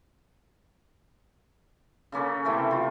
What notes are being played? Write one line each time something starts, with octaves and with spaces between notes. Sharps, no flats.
C#3 A#3 C#4 A4
C3 E3 A3
F4